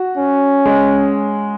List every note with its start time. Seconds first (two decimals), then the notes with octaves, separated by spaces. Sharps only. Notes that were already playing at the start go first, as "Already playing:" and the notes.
Already playing: F#4
0.17 C#4
0.66 G#3